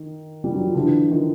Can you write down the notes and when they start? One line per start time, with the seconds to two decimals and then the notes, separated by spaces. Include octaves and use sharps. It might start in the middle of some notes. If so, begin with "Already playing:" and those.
Already playing: D#3
0.44 G3
0.55 F#3
0.65 F3
0.75 D3 E3
1.11 D#3 F3